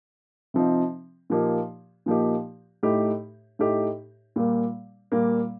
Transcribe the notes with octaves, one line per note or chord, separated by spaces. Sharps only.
C3 F3 C4 D#4
A#2 F3 A#3 D#4 G4
A#2 F3 A#3 D#4 G4
A2 A3 D#4 G4
A2 A3 D#4 G4
A#2 G3 A#3
A#2 G3 A#3